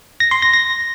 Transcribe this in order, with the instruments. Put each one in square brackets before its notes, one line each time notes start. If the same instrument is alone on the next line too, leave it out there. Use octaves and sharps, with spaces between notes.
[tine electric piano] A#6
C6
A#6
A#6